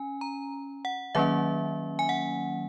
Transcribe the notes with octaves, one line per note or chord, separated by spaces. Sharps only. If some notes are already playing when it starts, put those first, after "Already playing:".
Already playing: C#4 G#5
A#5
F#5
D#3 F#3 A#3 C#4 E5
G#5
F#5